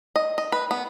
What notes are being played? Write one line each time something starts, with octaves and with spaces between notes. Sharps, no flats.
D#5
D#5
B4
B3